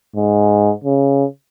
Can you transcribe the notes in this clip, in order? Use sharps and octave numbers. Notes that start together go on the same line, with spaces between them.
G#2
C#3